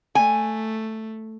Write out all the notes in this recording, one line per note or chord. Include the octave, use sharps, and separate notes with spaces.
A3 G#5